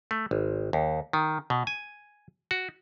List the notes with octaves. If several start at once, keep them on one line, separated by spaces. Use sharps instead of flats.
A3
G#1
D#2
D#3
B2
G#5
F#4